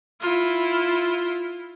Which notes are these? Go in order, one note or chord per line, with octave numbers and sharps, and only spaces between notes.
E4 F4